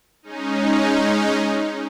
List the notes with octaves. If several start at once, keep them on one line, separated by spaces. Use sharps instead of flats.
G#3 C#4 D#4